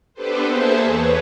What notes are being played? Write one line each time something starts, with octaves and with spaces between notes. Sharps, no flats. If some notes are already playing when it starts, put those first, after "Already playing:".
B3 D4 G4 A4 B4 C5
A#3 G#4 A4 C5 E5 A5
E2 B4 C#5